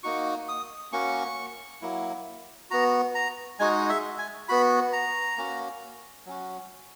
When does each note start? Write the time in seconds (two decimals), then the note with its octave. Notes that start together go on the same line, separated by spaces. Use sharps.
0.03 A#3 D#4 F#4 C#6
0.48 D#6
0.93 A#3 C#4 F#4 C#6
1.82 F#3 A#3 E4
2.70 B3 F#4 A#5
3.15 A#5
3.59 G#3 D#4 F#4 G#5
3.89 E5
4.19 G#5
4.49 B3 F#4 B5
4.93 A#5
5.38 A#3 C#4 F#4
6.26 F#3 C#4 F#4